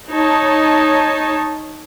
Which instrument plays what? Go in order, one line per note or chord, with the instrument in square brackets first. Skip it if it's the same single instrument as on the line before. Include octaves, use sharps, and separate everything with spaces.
[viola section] D#4 C#5 A5